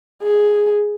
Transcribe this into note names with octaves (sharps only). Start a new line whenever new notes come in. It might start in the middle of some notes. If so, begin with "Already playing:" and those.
G#4